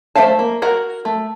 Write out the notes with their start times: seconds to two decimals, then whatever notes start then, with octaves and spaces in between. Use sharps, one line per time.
0.16 A3 C5 E5 F5 A5
0.39 A#3
0.62 F#4 A#4 F#5
1.05 A3